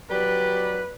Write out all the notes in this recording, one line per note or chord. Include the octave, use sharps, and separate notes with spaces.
F#3 G4 B4 D5